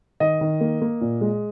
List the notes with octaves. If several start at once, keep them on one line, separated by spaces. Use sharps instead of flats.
D#3 D#5
D#3
A#3
A#3
A#2
G#3